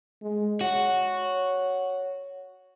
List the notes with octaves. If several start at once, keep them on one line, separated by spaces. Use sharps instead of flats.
G#3
F#4 C#5